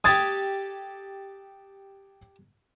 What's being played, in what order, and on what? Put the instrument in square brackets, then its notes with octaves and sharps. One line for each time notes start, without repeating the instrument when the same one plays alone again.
[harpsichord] G4 A4 D5 [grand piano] D#6 G#6 A6